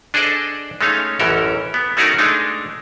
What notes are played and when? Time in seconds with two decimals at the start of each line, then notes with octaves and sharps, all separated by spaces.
0.14 D4 G#4 A4 C5 D5 D#5
0.81 G#3 A3 C#4 D#4 C#5 F5
1.19 A1 F#2 E3 C#4 A4 A#4
1.74 B3
1.97 A3 C#4 D#4 F#4 G#4 A#4
2.19 G#3 A3 D4 D#4